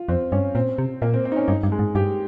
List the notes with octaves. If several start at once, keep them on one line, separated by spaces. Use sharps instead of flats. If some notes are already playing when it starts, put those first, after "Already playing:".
Already playing: F4
F2 C4
G2 C#4
A#2 C4
C3
A#2 A#3
C4
C4
D#4
C#4
G2 D#4
G2
G#3
G#2
G2 G4